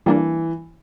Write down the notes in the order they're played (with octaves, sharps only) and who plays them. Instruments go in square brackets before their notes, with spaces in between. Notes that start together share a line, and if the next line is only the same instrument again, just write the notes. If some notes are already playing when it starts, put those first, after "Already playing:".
[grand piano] E3 [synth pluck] G3 A#3 D4